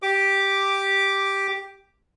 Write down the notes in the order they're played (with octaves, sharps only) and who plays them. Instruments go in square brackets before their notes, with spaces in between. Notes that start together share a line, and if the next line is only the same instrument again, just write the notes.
[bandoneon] G4 D6